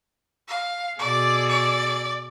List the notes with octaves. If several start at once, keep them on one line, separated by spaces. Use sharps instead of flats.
F5
B2 G#4 A4 D5
D5